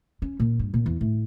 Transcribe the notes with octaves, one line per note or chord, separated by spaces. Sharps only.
C#4
A#2
G2
A#2
E2
A2